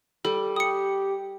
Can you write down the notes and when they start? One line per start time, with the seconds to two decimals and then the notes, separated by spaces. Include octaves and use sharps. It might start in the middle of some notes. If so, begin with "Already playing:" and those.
0.25 G3 A4
0.56 G4 D#6 C#7